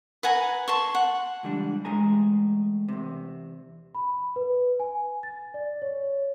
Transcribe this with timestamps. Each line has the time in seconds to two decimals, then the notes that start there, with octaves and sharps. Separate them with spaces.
0.23 B4 F#5 G#5 A#5
0.68 A5 C6 C#6
0.95 F#5
1.43 C#2 E3 G3 D4
1.85 E2 A2 G#3 G#4 G#5 A#5
2.88 E2 C3
3.95 B5
4.36 B4
4.80 G#5
5.23 A6
5.54 D5
5.82 C#5